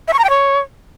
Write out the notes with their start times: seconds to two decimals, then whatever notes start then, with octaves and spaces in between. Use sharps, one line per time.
0.08 E5
0.13 C#6
0.19 A#5
0.24 G5
0.30 C#5